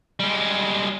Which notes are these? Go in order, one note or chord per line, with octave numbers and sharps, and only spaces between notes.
G3 G#3